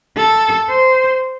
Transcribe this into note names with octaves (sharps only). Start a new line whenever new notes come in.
A4
C5